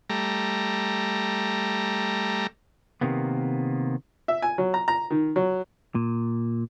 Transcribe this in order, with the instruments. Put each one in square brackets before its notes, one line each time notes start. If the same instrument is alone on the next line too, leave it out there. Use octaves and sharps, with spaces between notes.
[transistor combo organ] G3 A3 A#5
[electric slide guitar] C3 D#3 A#3 B3
[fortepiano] E5
G#5
F#3
A#5
A#5
D#3
F#3
[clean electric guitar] A#2